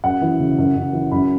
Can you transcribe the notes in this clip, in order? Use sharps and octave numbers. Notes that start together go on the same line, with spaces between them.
F#2 F#5
E3
C#3
F#2
F#2
E3
F#2 B5